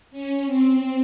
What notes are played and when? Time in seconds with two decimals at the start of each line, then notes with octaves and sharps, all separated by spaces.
0.11 C#4
0.46 C4